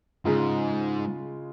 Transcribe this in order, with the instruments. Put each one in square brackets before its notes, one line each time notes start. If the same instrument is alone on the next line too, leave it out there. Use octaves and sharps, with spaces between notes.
[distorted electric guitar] G#2 [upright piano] C#3 G#3 F4